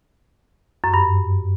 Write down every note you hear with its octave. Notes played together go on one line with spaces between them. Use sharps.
F#2
G2